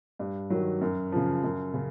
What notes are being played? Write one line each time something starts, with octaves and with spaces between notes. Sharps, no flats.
G2
D#3 F#3
F#2
C#3 F3
F#2
C#3